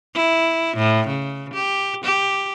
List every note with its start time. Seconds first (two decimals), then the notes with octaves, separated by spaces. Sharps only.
0.15 E4
0.77 A2
1.08 C#3
1.54 G4
2.04 G4